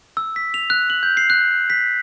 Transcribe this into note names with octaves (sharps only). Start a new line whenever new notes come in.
E6
B6
F7
F#6
F#7
G6
C7
F#6
B6